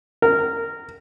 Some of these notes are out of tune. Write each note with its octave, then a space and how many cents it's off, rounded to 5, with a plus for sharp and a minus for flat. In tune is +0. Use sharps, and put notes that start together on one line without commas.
A#4 -15